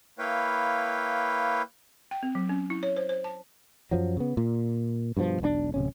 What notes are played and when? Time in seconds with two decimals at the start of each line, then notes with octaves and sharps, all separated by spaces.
0.19 A#3 E4 B4 C#5 F5 G5
2.11 G5
2.23 C4
2.35 F#3
2.49 C#4
2.70 E4
2.83 C#5
2.97 C5
3.09 C5
3.24 A5
3.91 F#2 F3 F#3
4.17 C#3 B3
4.37 A#2
5.17 G2 B2 D3 F3
5.40 E1 B1 A2 D4
5.74 D1 C3 C#4